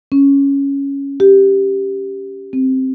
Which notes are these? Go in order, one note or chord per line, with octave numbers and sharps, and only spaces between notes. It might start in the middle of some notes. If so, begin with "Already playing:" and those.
C#4
G4
C4